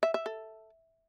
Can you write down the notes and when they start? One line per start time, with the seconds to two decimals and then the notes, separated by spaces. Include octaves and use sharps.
0.03 E5
0.14 E5
0.26 A4